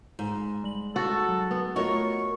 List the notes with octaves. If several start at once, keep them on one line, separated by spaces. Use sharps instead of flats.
G#2 D#4
G3 F#7
F#4 A4
F#3
B3
A3 F4 F#4 A#4 C#5 D#5 C#6